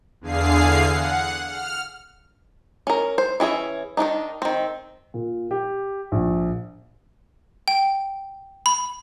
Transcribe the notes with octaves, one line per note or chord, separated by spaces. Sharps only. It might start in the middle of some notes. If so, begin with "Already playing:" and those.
E2 D3 G#4 F5 C7
F#5
F6
C#4 A#4
C5
E3 C#4 G#4 E5
D#3 E3 D4 D#4
D#3 C4
A#2
G4
A#1
G5
B5